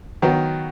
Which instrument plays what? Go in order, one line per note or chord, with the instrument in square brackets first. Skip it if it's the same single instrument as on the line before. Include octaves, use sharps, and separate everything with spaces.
[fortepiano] D#3 F#3 B3